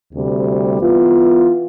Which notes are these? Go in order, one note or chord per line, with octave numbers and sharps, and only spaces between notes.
D2 C3 G3
E3 B3 F4